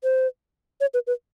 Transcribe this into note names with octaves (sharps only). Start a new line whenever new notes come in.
C5
C#5
B4
B4